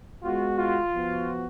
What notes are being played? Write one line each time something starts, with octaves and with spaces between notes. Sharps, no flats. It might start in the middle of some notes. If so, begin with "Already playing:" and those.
G#3 B3 F4 F#4
F4
F3 B3 F#4